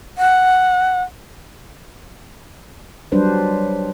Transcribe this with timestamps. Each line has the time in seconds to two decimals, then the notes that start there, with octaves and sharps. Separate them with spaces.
0.18 F#5
3.12 F#3 G3 D4 B4 C5